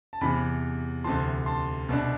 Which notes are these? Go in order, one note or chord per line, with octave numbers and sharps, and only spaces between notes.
A5
E2 C3 E3 G#5 B5
D2 C3 E3 A5 C6
A5 C6
C2 B2 B3 D4